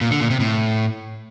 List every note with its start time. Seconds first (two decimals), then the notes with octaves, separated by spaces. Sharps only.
0.01 A#2
0.11 D3
0.21 A#2
0.30 C3
0.40 A2